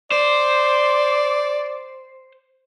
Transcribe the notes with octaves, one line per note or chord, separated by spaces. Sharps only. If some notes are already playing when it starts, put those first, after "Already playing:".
C5 D5